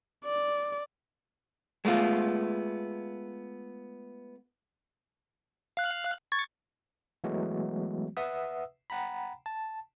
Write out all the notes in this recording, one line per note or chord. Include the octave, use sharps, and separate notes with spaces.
D5
G#3 A3 B3 F4
F5 F#6
C#6 G#6 A6
E3 F#3 G#3 A3 B3 F#4
B4 E5 F#5 D#6 E6
F#5 G5 A#5 B5
A5